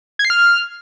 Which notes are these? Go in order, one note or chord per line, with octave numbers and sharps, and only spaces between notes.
G#6
C7
F6